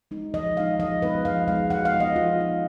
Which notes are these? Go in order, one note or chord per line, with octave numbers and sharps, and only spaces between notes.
G#3 D#4
F3 D#5
G#3 D#4 F5
F3 D#5
G#3 B3 D#4 B4
F3 F5
G#3 B3 D#4 F5
F3 F#5
F5
G#3 B3 D#4
D#5
F3 F4
G#3 B3 D#4